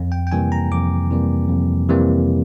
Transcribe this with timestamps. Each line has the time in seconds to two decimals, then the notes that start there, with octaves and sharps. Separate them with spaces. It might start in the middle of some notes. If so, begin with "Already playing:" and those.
Already playing: F2
0.12 G5
0.27 G5
0.32 C3 E3 G3 A#3 G#5
0.52 A#5
0.72 F2 D6
1.11 C3 E3 G3 A#3
1.49 F2
1.89 C3 E3 G3 A#3